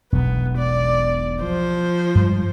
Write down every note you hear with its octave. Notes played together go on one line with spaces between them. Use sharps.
E1 B1 B3
D5
F3 C5
G2 G3 G#3